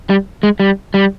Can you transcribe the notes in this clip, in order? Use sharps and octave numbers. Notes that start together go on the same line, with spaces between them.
G3
G#3
G3
G3